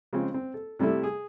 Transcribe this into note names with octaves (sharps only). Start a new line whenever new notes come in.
C#3 F3 G#3 C4
C4
A4
C3 G3 A3 E4 A4
G#4